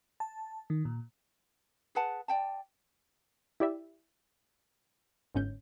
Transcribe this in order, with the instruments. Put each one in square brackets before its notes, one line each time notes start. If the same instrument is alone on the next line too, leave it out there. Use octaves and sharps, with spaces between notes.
[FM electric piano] A5
D#3
A#2
[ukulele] G#4 B4 F#5 A5
D5 G5 A5
[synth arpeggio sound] E4 G4 D5 E5
G1 G#2 C#4 G6